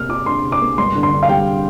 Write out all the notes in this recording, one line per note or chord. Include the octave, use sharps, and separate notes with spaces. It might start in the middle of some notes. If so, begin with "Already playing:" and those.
Already playing: C3 A#3 F6
F4 D6
D4 C6
C3
D6
A#3
G2 C6
D3
C6
D4
F5
G3 G5